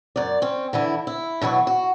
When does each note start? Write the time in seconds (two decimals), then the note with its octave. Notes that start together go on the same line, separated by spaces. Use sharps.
0.16 F#2 D5
0.42 C4 C#4
0.73 D3 E3 E4
1.07 E4
1.41 B2 E3 F#3 F#4
1.67 F#4